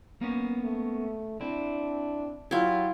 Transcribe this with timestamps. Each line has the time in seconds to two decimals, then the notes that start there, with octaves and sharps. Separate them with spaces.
0.21 A#3 B3 C#4
0.64 A3
1.41 C4 D4 E4
2.51 F#3 E4 F4 G4